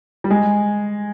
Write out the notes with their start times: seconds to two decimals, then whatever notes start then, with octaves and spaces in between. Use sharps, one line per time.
0.24 G3
0.30 G#3